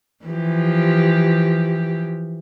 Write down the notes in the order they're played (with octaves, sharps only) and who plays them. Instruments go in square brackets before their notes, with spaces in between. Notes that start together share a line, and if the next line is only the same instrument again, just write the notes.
[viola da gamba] E3 F3 G4